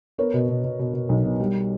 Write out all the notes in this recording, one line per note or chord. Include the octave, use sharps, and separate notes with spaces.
B3 A#4 C#5
B2
B2
B2
B2
B2
B1
B2
G3